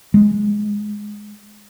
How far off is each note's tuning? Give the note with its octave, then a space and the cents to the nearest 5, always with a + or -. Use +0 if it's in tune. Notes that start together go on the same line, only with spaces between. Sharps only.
G#3 +5